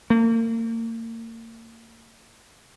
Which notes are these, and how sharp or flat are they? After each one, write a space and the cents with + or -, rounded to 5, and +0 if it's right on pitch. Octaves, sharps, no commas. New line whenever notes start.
A#3 -35